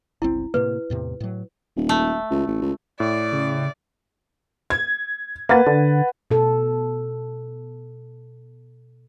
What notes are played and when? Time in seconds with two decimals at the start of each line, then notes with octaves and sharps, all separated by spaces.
0.22 G1 C#2 C4 E4
0.54 A2 C3 A#3 B4
0.90 E2 A2 C3
1.20 A2 F#3
1.76 D#1
1.89 A3
2.30 C#2
2.47 A1
2.61 C#2
3.00 A2 D5
3.33 C#3
4.70 G#6
5.49 A#3 B4 F#5 A6
5.67 D3
6.31 B2 A4